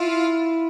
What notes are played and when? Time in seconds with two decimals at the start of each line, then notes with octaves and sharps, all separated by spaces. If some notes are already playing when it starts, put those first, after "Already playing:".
Already playing: E4 F4